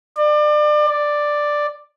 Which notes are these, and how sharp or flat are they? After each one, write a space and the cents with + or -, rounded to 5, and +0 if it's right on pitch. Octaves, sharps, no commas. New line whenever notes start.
D5 +30
D5 +5